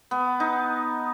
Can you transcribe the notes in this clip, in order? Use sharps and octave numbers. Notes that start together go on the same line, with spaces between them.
B3
D#4